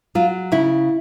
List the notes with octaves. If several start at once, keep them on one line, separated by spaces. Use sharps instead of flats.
F#3 F4
C#3 E4